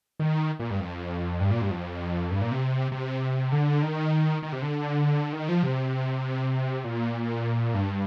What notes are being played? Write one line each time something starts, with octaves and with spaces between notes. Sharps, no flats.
D#3
A#2
G2
F2
G2
A#2
G2
F2
G2
A#2
C3
C3
D3
D#3
D#3
C3
D3
D#3
F3
C3
A#2
G2